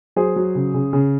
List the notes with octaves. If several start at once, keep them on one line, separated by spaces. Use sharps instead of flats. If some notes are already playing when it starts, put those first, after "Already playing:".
F#3 G#4 C5
F#3
C#3
C#3
C#3